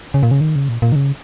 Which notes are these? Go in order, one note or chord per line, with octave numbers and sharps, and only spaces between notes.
C#3
A#2
C#3
D#3
C#3
A#2
A#2
D#3
C#3